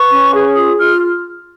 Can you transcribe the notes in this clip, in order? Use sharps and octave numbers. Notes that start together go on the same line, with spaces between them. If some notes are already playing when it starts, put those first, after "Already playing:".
Already playing: B4 C#6
C#4
G#4
F4 D#6
F4 F6